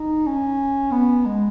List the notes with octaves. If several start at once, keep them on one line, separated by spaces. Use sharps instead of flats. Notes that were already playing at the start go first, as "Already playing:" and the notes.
Already playing: D#4
C#4
B3
G#3